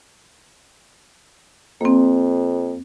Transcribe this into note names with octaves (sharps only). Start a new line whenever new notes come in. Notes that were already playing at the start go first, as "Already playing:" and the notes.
F2 A#3 C4